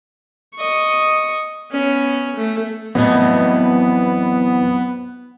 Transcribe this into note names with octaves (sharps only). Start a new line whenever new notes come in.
D#5 C#6
B3 C#4
A3
E2 A2 E3 F#3 B3 C4 D#5